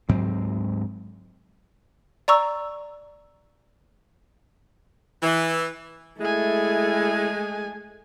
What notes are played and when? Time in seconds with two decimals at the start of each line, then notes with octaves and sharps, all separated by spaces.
0.09 D2 G#2 F#3 C4
2.28 D5 A#5 C#6 E6
5.22 E3
6.20 G#3 A3 E4 G#4 G#5